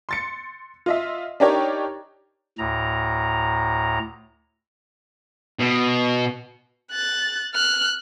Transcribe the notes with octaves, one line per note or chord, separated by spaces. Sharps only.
C6 A6 C#7
F4 D#5 E5
D4 D#4 G4 A#4 C#5 D5
D2 A2 A#5
B2
F#6 A6
F6 F#6